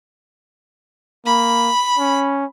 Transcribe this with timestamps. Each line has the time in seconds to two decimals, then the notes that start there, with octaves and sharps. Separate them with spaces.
1.26 A#3 B5
1.98 C#4